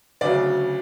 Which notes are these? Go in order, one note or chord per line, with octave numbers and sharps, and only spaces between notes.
D2 C#3 F#3 D5